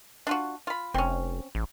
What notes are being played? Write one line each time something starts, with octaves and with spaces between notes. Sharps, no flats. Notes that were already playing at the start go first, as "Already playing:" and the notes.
D4 F4 F#4
F4 B5
F1 C4 C#4
A1